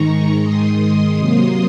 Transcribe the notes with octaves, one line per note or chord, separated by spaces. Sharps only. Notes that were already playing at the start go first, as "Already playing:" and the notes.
Already playing: G#2 D#3 G#3 A#5 C#6
C6 D#6
C3 F#3 A#3